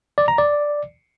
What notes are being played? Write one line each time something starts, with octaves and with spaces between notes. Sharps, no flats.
D5
A#5
D5